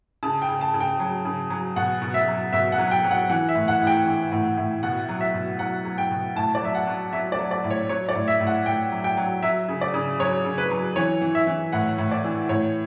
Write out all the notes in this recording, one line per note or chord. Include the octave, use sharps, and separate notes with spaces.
C#3 A5
G5
C#3
A5
C#3
G5
F#3
C#3
F#3
B2 F#5
B2
E5
F#3
B2 E5
F#5
F#3
G5
F#3
F#5
E3 F#5
E5
A2
F#5
A2
G5
E3
A2
A2
B2 F#5
F#3
E5
B2
F#3 F#5
F#3
G5
B2
A2 A5
D5
F#3 E5
F#5
F#3
F#3 E5
D5
F#3
D5
A2
C#5
F#3 C#5
D5
A2
E5
A2
F#5
A2 G5
F#3
G5
F#3
F#3 E5
C#3
D5
C#3
F#3 C#5
C#3
B4
F#3
E3 C#5
E3
E5
E3
A2 F#5
A2
D5
E3
A2 C#5